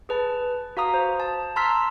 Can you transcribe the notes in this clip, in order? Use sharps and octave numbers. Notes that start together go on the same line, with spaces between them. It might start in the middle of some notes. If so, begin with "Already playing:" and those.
G#4 B4 A5
F#4 F5 A#5 D#6
C5
A5
A5 A#5 C6 E6 F6 B6